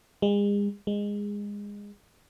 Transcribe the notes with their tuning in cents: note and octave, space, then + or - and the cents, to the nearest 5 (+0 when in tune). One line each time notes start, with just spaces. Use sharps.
G#3 -40
G#3 -20